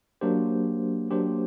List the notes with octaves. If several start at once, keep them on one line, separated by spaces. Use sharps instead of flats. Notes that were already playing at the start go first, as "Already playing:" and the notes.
F#3 A#3 D4 G4 C5
F#3 A#3 D4 G4 C5